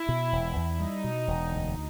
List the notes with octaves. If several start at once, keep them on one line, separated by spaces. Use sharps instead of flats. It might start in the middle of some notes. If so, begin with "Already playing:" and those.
Already playing: E4
B2
E1
E2
G3 D#4
B2
E1
D2